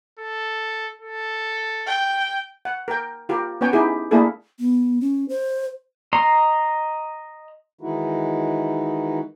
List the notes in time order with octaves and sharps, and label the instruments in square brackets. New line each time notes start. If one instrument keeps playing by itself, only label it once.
[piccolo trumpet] A4
A4
[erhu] G5
[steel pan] F#5
A#4 G5
F4 G4 A#4
B3 C#4 C#5 G5 G#5
D#4 E4 G4 G#4
A3 A#3 D4 E4 G#4 A4
[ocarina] B3
C#4
C5
[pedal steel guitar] D#5 A#5 C6
[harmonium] D#3 E3 G#3 D#4 E4 F#4